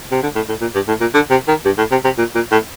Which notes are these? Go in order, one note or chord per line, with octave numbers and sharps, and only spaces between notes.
C3
D3
A2
A2
A#2
G2
A2
A#2
D3
C3
D#3
G2
A2
C3
C3
A#2
A#2
A2